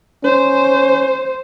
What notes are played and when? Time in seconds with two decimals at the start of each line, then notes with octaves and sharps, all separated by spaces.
0.24 C#4 C5